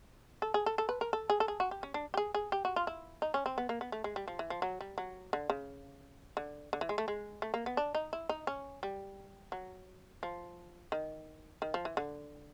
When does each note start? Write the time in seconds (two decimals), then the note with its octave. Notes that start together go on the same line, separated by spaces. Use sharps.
0.42 A4
0.54 G#4
0.66 A4
0.78 A4
0.89 B4
1.01 A#4
1.13 A4
1.30 G#4
1.40 A4
1.48 G#4
1.60 F#4
1.71 G4
1.83 C#4
1.94 D4
2.14 G4
2.17 G#4
2.34 G#4
2.52 G4
2.65 F#4
2.76 F4
2.87 E4
3.22 D#4
3.34 C#4
3.46 C4
3.58 B3
3.69 A#3
3.81 B3
3.92 A3
4.04 G#3
4.16 G3
4.28 F3
4.39 E3
4.50 F3
4.62 F#3
4.81 G3
4.98 F#3
5.33 D3
5.50 C#3
6.37 D3
6.73 D3
6.81 E3
6.89 G#3
6.98 A3
7.08 G#3
7.42 A3
7.54 A#3
7.66 B3
7.77 D4
7.95 D#4
8.13 E4
8.29 D#4
8.47 C#4
8.83 G3
9.52 F#3
10.23 F3
10.92 D#3
11.62 D#3
11.74 F3
11.85 E3
11.97 D3